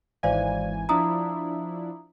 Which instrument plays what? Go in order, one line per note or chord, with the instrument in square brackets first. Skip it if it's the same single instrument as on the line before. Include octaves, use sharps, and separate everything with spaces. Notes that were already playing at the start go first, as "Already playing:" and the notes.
[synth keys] G#1 E3 G#5 [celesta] C5 D5 F5
[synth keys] F3 D4 E4 [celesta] A#5 D#6